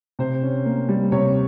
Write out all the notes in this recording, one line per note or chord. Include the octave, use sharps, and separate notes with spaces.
C3 C5
C#4
A#3
G3
C3 C#5